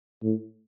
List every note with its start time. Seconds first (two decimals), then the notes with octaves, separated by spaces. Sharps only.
0.23 A2